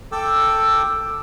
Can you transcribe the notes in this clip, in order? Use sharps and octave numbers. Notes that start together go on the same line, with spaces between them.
A4 G5 D6 E6